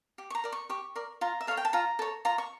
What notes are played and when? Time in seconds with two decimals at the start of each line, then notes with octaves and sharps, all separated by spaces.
0.18 G4
0.30 C#6
0.35 A#5
0.44 A#4 D5
0.52 C#6
0.69 G4 C#6
0.96 A#4 D5
1.21 F4 A#5
1.41 E5
1.47 A4 C#5 F5
1.57 G5
1.65 A5
1.73 F4 A#5
1.99 A4 C#5
2.25 F4 A#5
2.38 C#6